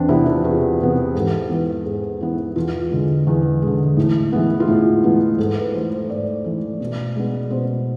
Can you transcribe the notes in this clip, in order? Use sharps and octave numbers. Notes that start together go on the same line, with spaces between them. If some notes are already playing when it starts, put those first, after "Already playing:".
Already playing: E2 C4 D4
C3 E3 B3 E4
F4
E2 G#4
C3 E3 B3
G#2 A4
E3 B3 B4
G#2 G#4
E3 B3
E2 F4
D3 G#3
E2
D3 G#3
A2
E3 G#3 B3
F4
A2 G#4
E3 G#3 B3
G#2 A4
B4
E3 A3 C5
C5
G#2 D5
E3 A3
B2
G#3 B3
B2 C5